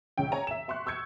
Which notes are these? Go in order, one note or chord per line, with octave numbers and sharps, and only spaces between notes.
C#2 C#4 G5
C#5 G#5 A#5
E5 E7
E5 C6 C#6 F#6
C#6 E6 G6 G#6 C#7